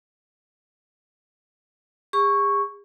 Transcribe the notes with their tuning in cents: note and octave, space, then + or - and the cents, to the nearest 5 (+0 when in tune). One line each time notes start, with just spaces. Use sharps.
G#4 -45 C#6 +0